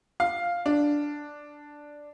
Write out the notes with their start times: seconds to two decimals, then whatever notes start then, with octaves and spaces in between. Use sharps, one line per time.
0.20 F5
0.66 D4